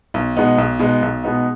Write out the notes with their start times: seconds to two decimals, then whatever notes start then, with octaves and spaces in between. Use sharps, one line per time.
0.14 B1
0.36 B2 G#3 B3 D#4
0.58 B1
0.79 B2 G#3 B3 D#4
1.02 B1
1.24 B2 G#3 B3 D#4